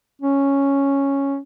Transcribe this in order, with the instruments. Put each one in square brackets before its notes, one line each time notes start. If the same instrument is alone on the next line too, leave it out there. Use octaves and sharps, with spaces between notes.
[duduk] C#4